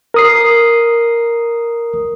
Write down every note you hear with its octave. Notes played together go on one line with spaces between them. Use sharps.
A#4 D#6 C7